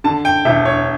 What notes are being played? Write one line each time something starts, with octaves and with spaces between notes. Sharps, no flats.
D3 A5
G5
E1 E5
C#5